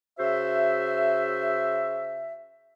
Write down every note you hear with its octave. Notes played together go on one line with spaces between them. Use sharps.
C#3 F#4 C5 E5